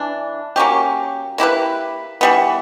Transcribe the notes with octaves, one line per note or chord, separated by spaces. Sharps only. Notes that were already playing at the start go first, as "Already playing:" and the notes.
Already playing: E3 D4
F#3 A#3 C#4 G4
A#3 E4 G4 B4
E3 G3 B3